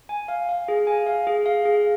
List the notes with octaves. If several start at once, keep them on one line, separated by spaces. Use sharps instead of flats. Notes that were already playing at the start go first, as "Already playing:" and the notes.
G#5
F5
F5
G#4
G#5
F5
G#4
F5
G#4